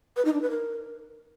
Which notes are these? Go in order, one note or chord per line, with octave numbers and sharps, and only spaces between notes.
B4
D#4
D4
B4
A#4